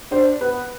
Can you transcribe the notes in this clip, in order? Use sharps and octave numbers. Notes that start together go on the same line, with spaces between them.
D4 C5
B3 B4